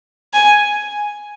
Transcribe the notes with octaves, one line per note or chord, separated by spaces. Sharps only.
G#5